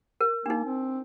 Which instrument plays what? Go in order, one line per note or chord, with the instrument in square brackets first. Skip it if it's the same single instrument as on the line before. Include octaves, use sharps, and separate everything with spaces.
[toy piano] A#4
[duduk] A#3 [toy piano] D4 D#4
[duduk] C4